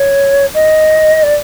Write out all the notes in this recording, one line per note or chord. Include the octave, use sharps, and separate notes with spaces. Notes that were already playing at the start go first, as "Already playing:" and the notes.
Already playing: C#5
D#5
D5